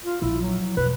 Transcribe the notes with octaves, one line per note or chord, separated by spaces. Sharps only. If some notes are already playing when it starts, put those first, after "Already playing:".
F4
A#1 E4
F#3
E1 B4